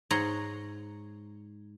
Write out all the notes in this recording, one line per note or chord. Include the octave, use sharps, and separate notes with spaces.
G#2 C#5 F#5 A#5 C6